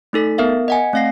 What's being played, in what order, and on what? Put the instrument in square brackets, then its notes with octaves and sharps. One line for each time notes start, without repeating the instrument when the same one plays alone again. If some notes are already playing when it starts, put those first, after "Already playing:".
[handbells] A3 D#4 A4 B6
B3 A#4 E5 F5
D#5 F#5 G#5
A3 C4 F5 A#6 C7